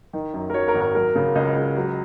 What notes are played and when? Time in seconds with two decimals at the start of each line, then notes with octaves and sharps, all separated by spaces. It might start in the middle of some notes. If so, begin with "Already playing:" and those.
0.13 D#3
0.34 F#2
0.50 A#4
0.54 F#3 C#5
0.68 A#4
0.74 G#1
0.81 A#4
0.95 F#3 A#4
1.15 C#3
1.35 C#2 D#5
1.56 C#2
1.76 F#3